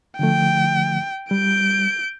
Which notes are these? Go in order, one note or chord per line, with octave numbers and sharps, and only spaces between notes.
D3 F3 A3 G5
G3 G6 D7